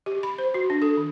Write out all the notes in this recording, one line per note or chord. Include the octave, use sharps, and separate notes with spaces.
G4
B5
C5
F#4
D4
A4
D#3